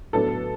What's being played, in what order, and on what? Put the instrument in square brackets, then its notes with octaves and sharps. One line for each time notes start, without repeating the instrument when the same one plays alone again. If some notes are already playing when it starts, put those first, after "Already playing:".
[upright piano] A2 F#3 B3 D4 A4